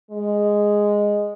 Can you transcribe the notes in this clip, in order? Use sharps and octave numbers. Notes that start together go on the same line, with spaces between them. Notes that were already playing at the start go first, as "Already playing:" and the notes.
G#3